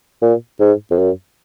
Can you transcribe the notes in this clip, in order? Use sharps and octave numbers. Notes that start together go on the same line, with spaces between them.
A#2
G#2
F2
F#2